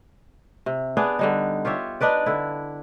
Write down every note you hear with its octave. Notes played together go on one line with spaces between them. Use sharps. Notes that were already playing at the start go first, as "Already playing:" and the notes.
C3
B3 D4 G#4 D5
D3 G3 D#4
F4 G4 C#5 E5
D4 D#4 B4 D5
D3 E4